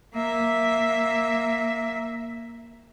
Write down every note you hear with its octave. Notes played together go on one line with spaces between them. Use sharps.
A#3 E5